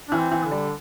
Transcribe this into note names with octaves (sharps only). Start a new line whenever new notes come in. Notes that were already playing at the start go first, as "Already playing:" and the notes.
E3 D4
C4
E3
D3
G3